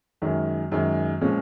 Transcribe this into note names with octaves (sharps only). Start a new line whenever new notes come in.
F#2 D#3 G#3
F#2 D#3 G#3
A#2 F3 G#3 C#4